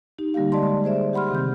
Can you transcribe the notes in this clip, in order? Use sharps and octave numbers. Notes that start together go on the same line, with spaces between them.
D#4 G4
D3 G3 A#3 G4 F5
G#3 D5 D#5 A5 C6
G#4 C5 D5 E5
G4 F#5 B5 C6 F6
C3 D#3 C4 G6